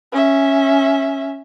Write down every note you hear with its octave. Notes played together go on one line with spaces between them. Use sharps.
C#4 E5